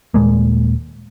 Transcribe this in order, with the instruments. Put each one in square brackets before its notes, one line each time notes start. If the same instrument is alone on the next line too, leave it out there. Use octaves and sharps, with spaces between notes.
[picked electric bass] D#1 A#2 G#3 A#3